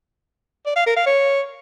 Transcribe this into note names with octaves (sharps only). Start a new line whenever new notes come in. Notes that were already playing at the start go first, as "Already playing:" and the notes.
D5
F5
A#4
F5
C#5